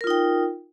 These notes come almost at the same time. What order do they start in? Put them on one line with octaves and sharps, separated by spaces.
A#4 F4 D#4 G5